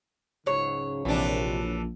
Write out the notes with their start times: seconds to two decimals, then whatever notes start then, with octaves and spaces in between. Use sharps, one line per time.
0.46 C#2 G#2 C#3 F#3 C#5
1.05 A#1 C3 E3 D4